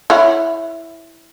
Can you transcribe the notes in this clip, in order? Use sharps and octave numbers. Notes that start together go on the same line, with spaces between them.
E4 C#5 F#5